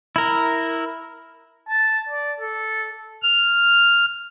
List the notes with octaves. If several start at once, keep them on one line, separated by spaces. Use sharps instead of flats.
E4 A#4
A5
D5
A4
F6